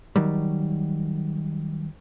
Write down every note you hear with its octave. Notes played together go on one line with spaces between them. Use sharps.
D#3 F#3 G3